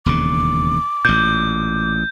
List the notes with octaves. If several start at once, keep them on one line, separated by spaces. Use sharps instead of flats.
E1 D#2 C#3 D6
A1 A#2 G6